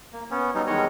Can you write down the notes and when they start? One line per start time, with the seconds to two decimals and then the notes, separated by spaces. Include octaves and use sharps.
0.13 A#3
0.31 B3 C#4
0.55 F#3 G3 B3 D#4
0.67 E2 D#3 G3 G#3 C#5 D#5